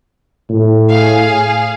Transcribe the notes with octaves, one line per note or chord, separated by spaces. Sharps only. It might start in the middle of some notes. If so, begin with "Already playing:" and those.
A2
G#4 F5